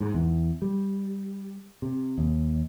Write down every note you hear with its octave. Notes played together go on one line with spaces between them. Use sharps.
G#2
E2
G3
C3
D#2